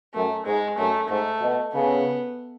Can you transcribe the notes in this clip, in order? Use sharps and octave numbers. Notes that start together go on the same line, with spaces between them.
F#2 A3
G#2 G#3
F#2 A3
G#2 A3
B2
C#3 B3